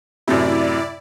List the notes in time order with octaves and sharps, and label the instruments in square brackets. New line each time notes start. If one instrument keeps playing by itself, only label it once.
[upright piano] F#2 A2 C3 [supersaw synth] E4 D5